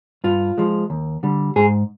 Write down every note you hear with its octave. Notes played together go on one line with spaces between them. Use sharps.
G2 F4
F3 G#3
D#2
D3 G3
G#2 G#4